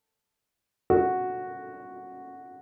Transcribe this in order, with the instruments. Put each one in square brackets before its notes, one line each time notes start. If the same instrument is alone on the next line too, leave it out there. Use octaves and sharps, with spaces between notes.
[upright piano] F#4